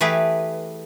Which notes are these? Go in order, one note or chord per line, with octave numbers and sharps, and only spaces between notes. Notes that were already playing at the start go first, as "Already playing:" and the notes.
E3 A3 G4 G#4 B4